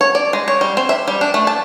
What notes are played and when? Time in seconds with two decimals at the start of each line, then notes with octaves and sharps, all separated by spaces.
0.01 C#5
0.15 D5
0.33 G#3
0.48 C#5
0.61 G3
0.77 C4
0.89 E5
1.08 G3
1.21 D4
1.34 A3
1.47 A5